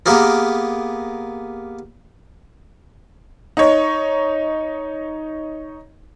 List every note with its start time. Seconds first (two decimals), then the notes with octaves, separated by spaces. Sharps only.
0.06 A#3 B3 G4 G#4 A#4
3.57 D#4 C#5